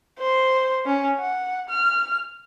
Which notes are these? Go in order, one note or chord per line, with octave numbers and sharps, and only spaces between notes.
C5
C#4
F#5
F6